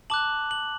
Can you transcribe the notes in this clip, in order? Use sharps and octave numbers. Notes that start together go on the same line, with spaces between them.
A5 D6 F#6 F#7
F#7